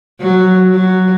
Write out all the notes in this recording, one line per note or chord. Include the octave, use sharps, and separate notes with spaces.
F#3
F#3